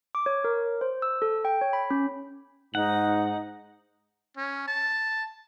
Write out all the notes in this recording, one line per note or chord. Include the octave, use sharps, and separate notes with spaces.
D6
C#5
A#4
C5
E6
A4
G5
C#5
B5
C#4
G#2 D#4 F#5
C#4
A5